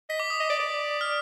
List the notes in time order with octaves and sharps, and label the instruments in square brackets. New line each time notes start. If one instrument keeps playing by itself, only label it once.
[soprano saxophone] D#5 [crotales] B6
[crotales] D6
D#6
[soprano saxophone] D#5
D5
D5
[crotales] F6